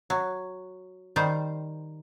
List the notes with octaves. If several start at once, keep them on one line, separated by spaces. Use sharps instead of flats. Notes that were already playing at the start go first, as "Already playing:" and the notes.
F#3
D#3 G3 C5